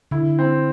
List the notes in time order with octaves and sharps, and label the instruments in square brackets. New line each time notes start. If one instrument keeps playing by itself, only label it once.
[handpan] D3 [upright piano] E4
[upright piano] C4